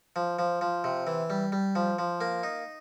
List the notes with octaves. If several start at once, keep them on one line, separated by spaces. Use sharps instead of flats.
F3
F3
F3
C3
E3
G3
G3
F3
F3
A#3
D#4